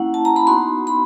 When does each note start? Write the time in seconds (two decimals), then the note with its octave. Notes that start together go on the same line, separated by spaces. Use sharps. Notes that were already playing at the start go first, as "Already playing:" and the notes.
Already playing: A#3 C#4 E4 F#5
0.14 A5
0.25 A#5
0.36 B5
0.47 B3 D#4 F#4 C6
0.87 B5